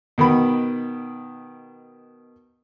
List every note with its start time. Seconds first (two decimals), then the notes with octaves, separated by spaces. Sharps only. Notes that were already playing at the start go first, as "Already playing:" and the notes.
0.18 B2 D#3 B3 B5